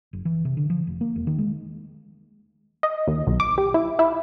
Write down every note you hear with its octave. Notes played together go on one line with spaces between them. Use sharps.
F#1
E3
C3
D3
F3
F1
A#3
E1
D#3
G#3
D#5
D#2
B1
D6
G4
E4
E4